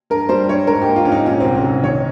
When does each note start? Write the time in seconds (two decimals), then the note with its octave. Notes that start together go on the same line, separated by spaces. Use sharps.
0.10 G2 A#4
0.29 G3 C5
0.49 G2 C#5
0.67 G#2 A#4
0.82 G4
0.88 A#3
0.96 F4
1.05 G#2 C#4
1.12 D#4
1.26 A#2 C#4
1.40 C2 C4
1.55 C#4
1.64 C2
1.83 D#3 C#5